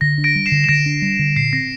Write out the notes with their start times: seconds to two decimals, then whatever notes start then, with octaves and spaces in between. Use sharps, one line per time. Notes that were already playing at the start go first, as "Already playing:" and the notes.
0.01 D3 A#6
0.18 D4
0.24 A#6 D7
0.35 G3
0.46 C7 E7
0.52 D3
0.64 E7
0.69 D3 A#6 D7
0.86 D4
1.02 G3
1.19 D3
1.36 A#2 C7
1.53 C4 A#6